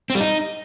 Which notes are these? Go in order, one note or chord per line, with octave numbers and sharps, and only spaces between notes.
C4
G3
D#4